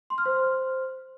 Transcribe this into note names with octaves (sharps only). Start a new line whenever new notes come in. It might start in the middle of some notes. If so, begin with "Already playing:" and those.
C6
F6
C5